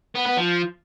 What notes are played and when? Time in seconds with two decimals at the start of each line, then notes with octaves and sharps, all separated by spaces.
0.15 B3
0.26 B3
0.37 F3